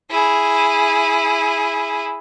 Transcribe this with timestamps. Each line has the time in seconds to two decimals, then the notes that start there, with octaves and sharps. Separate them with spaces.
0.11 E4 G#4